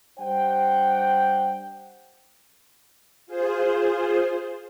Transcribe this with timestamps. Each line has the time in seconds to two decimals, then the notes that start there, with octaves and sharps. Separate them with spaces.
0.19 G3 D4 C5 F#5 G5
3.27 F4 G#4 C5